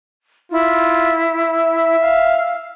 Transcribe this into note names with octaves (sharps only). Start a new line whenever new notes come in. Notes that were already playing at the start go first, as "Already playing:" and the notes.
E4 F4
E5
F5